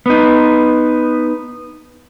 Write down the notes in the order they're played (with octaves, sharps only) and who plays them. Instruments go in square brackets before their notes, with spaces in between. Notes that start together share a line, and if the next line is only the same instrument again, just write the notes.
[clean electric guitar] B3 D#4